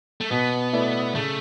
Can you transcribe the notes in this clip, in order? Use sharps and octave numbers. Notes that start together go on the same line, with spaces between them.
A3
B2 B3
A3 E4 B4 D5
C#3 A3